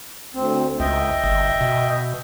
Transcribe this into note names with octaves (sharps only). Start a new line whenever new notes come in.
D2 C4
C#2 D#5 E5 G5
G1
B2